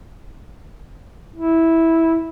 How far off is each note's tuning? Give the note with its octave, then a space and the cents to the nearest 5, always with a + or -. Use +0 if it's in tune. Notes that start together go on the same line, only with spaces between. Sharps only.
E4 -10